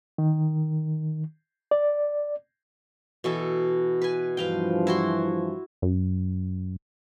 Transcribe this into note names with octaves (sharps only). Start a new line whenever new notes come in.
D#3
D5
B2 E3 A4
B4 G#5
G2 E3 F3 B4 F5 G5
E4 F#4 C6
F#2